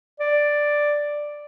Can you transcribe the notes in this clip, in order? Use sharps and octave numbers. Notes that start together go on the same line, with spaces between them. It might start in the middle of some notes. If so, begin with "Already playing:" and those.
D5